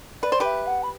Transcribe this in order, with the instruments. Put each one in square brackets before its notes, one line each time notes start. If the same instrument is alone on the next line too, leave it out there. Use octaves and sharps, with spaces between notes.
[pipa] B4 [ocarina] D5
[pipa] C5
[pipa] G4 B4 [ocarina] E5
[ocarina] F#5
B5